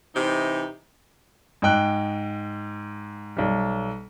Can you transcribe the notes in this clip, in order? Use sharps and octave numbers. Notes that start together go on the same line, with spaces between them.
C3 E3 C4 D#4
G#2 D#5 G5 F#6
B1 G3